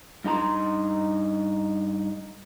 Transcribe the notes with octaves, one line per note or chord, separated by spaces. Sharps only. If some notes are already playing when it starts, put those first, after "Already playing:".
G2 D#4 A4 A#5 C6